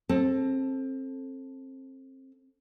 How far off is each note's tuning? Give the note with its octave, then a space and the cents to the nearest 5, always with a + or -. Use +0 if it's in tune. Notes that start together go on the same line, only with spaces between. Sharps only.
C4 +25 A4 +0